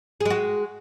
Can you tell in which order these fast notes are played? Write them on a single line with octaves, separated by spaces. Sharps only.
G#4 G#3 F#4